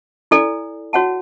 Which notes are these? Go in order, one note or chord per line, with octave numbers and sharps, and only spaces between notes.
E4 A4 D5 G#5
F#4 C#5 F#5 A5